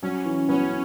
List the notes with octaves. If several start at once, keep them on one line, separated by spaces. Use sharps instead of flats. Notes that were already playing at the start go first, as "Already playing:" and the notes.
F#3 C#4
E3
F#3 B3 C#4